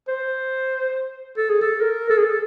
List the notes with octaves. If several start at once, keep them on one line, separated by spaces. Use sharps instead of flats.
C5
A4
G#4
A4
A#4
A4
G#4
A4